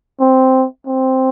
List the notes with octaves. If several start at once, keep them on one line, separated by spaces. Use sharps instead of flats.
C4
C4